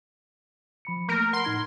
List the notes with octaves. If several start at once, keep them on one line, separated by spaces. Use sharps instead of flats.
F3 B5 C#7
A3 A#3 A#4
F#5 B5 C6
A2 D#4 G#6